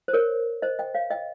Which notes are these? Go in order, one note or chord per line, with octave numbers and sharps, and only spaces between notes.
C5
A#4 C#5
C5 D#5
D#5 G5
C#5 F5
D#5 G5